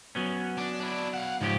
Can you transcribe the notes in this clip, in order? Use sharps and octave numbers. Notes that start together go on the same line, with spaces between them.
F#3 B3 C#4
D4
D4 E4
F5 F#5
G#2 C#3 F3 G4